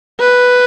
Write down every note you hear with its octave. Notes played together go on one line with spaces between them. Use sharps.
B4